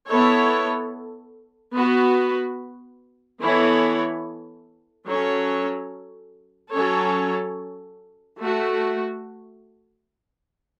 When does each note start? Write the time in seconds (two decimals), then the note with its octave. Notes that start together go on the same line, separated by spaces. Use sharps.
0.10 B3 E4 A4 C#5
1.76 B3 F#4 B4
3.42 E3 B3 E4 A4 C#5
5.07 F#3 C#4 A4 C#5
6.73 F#3 C#4 A4 C#5
8.40 A3 F#4